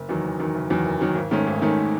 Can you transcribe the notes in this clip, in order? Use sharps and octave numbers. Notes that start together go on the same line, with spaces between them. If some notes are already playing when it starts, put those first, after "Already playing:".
Already playing: F#1
E2 D#3 F#3
F#1
E2 D#3 F#3
F#1
E2 D#3 F#3
F#1
E2 D#3 F#3
G#1
G#2 D#3 A3 C#4
G#1
G#2 D#3 A3 C#4